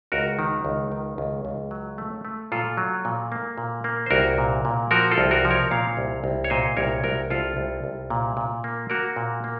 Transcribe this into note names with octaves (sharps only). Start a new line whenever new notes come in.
C#2 F#4 A#4
D#3
C#2
D#3
C#2
C#2
F#3
A3
A3
A#2 F4 A4
F#3
A#2
A#3
A#2
A#3
C5
C2 F#4 A#4
A#2
A#2
F3 F#4 A#4
F4 A4
C2
F#4 A#4
F3
A#4 C#5
A#2 C#5 F5
C2
C2
C#5
A#2 C5 D#5
C2 A#4 C#5
C2 F#4 A#4
C2 F4 A4
C2
C2
A#2
A#2
A#3
A#3 F#4 A#4
A#2
A#3